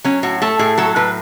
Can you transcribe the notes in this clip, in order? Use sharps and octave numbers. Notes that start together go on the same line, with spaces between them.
F#3 C#4
A2 F#4
A3 A4
A2 G#4
F#3 A4
A2 B4